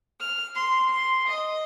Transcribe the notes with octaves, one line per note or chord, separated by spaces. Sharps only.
F6
C6
C6
D#5